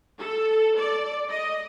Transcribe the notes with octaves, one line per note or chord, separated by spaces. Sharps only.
A4
D5
D#5